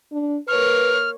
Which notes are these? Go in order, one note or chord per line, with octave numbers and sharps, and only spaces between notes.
D4
A#3 B4 C#5 F6